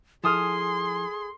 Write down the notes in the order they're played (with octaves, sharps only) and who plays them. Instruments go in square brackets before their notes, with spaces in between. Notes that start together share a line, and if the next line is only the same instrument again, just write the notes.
[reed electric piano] F3 E4 G#5 [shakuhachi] G#4 [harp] A4 D#6 F6 [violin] C6